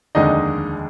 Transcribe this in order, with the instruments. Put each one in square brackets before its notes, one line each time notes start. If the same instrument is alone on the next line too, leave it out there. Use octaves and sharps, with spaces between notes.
[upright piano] F1 D#2 D3 G#3 D4 D#4 D#5